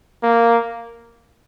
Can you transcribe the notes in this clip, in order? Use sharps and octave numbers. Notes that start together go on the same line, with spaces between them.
A#3